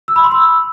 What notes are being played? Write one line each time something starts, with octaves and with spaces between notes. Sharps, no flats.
E6
B5
C6
E6